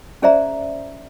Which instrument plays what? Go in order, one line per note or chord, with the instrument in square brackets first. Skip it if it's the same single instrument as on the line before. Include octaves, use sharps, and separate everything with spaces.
[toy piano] C#4 G#4 C5 D5 E5 A#5